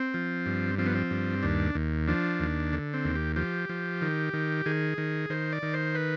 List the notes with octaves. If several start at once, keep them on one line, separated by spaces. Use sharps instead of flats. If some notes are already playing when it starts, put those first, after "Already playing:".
Already playing: C4
F3
G2
F3 C4
B3
C4
G2
D#2 D4
D#2
F3 D4
D#2
D3
C4
D#2
G4
F3 G4
F3
D#3
D#3
D#3 G#4
D#3
D#3 C5
D5
D#3
C5
B4